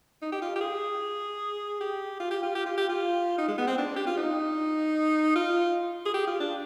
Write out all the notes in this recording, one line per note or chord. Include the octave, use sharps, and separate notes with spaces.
D#4
G4
F4
G4
G#4
G4
F4
G4
F4
G4
F4
G4
F4
D#4
G#3
B3
C4
D4
G4
F4
D#4
F4
G#4
G4
F4
D4